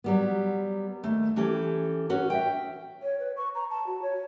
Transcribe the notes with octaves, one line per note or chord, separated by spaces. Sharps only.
F#3 G3 B3
D#2 A3
E3 C#4 G4 A4
C#4 F#4 B4
E5 G5
C#5
B4
C#6
A#5
A5
F#4
C#5